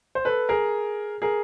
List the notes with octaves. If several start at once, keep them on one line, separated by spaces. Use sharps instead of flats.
C5
A4 B4
G#4 A#4
G#4 A#4